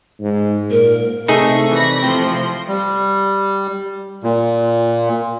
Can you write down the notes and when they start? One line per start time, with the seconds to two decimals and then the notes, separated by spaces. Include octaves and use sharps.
0.21 G#2
0.70 A#2 A#4
1.28 C3 A3 D#4 G#4 C#6
1.72 E3 D5 B5 A#6
2.02 F3 A3 C4 C6
2.68 G3
4.24 A#2